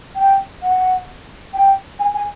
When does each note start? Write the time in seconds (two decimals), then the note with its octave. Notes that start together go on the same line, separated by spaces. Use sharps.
0.16 G5
0.63 F#5
1.54 G5
1.99 G#5
2.14 G#5